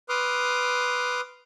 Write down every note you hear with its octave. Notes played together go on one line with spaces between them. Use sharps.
B4 C6 D6 D#6 F6